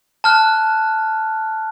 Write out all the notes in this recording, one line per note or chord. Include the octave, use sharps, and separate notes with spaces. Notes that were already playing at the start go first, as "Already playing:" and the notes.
A5 F6 F#6